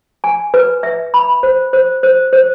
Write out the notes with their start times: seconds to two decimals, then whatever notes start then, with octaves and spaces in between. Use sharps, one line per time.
0.24 G#5
0.54 B4
0.83 E5
1.14 B5
1.43 C5
1.73 C5
2.03 C5
2.33 C5